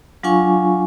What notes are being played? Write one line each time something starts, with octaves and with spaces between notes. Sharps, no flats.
F#3 D4 F4 F5 G#5 C#6